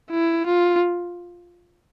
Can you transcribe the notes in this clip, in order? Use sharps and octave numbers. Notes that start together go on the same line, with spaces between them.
E4
F4